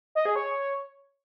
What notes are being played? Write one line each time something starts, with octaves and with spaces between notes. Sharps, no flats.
D#5
G#4
C#5